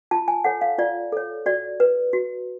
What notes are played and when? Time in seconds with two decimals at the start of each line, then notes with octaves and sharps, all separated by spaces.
0.11 F4 A5
0.28 G#5
0.44 A4 C#5 F#5
0.61 F5
0.78 F4 D5
1.12 A4 C#5
1.46 F#4 D5
1.80 B4
2.13 F#4